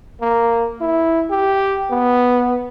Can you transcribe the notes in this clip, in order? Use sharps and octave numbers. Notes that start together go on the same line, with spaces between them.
A#3
E4
G4
B3